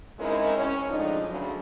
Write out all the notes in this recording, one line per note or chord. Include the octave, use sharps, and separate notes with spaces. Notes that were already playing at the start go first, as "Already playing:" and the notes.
G#3 C4 C#4 D#4 E4 A#4
C#4
A2 C#3 F3 G#3 D4 D#4
D2 C#3 F#3